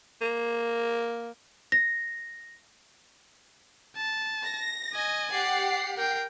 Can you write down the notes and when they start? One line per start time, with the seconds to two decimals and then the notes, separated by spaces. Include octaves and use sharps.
0.22 A#3
1.72 A#6
3.97 A5
4.44 A#6
4.93 D#5 G#5
5.32 G4 D5 F#5 C7
5.97 A#4 G5